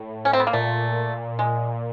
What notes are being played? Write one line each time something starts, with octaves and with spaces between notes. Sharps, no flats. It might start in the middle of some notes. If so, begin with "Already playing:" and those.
Already playing: A2
C#4
C4
B3
A#3
A#2 A3
G#3